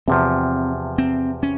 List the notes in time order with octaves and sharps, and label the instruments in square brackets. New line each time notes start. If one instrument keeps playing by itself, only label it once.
[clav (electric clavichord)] E2 C3 F3 [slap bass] C4
[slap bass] C4
C#4